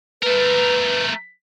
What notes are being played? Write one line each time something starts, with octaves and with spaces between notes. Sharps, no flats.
A3 A#4 B4